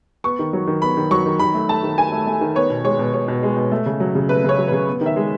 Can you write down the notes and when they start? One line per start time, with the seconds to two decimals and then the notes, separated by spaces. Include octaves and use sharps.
0.24 B3 C#6
0.39 D#3
0.53 F#3
0.67 D#3
0.82 B3 B5
0.97 D#3
1.11 F#3 C#6
1.26 D#3
1.39 D#3 B5
1.54 A3
1.69 A3 A5
1.83 D#3
1.98 D#3 G#5
2.12 A3
2.27 A3
2.41 D#3
2.55 B3 C#5
2.70 B2
2.84 G#3 C#5
2.99 B2
3.13 B3 C#5
3.28 B2
3.43 G#3
3.57 B2
3.72 A3
3.86 C#3
4.00 F#3
4.15 C#3
4.29 A3 B4
4.44 C#3 C#5
4.58 F#3
4.68 B4
4.72 C#3
4.87 B3
5.01 D#3
5.06 E5
5.16 G#3